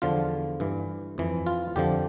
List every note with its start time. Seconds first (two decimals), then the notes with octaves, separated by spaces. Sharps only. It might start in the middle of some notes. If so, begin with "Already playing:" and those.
0.02 E2 D3 F3 F4
0.60 G2 E3
1.18 F2 E3
1.47 F4
1.76 F2 D3 F3 G4